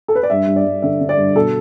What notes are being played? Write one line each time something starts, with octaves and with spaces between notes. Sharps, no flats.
A4
B4
D5
G2 E5
G2
D5
G2
D3 E5
D3
D5
G2
B2 A4